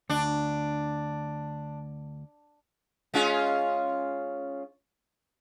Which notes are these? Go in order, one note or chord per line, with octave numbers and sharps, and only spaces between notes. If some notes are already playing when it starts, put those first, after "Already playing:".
D2 D4
G#3 C#4 F4